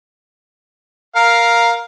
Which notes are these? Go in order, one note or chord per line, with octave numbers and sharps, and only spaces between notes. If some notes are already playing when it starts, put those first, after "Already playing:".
A#4 F5